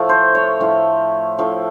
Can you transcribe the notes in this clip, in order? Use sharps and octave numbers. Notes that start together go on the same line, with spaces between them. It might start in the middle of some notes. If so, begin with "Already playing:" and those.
Already playing: A2 F3 A3
C5
C#5
A2 F3 A3
A2 F3 A3